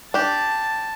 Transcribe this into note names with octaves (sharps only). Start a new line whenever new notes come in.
D4 G4 A5